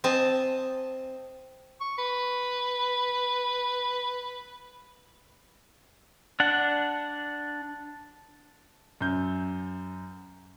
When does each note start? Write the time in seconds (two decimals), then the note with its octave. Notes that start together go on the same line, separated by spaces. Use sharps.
0.04 C4 D#5 G#5 A5
1.81 C#6
1.98 B4
6.40 D4 F#5
9.01 F#2 G6